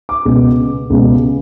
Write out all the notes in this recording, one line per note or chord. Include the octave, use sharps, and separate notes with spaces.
D6
C#2 B2 G#3
C#2 B2 G#3